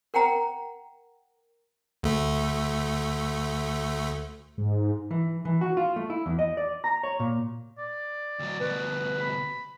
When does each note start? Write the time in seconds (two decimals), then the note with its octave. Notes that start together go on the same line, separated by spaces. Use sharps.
0.14 A#4 F#5 G5 A#5
2.03 D2 A3
4.58 G#2
5.11 E3
5.45 E3
5.61 F#4
5.77 F4
5.96 A3
6.10 E4
6.26 E2
6.39 D#5
6.57 D5
6.84 A#5
7.03 C#5
7.20 A#2
7.78 D5
8.39 D2 F#3
8.61 D2 B2 B4
9.20 B5